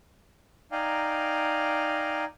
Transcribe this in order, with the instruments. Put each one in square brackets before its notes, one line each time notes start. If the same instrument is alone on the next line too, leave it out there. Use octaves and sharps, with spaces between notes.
[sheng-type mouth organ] D#4 D5 F5 G5 G#5 A#5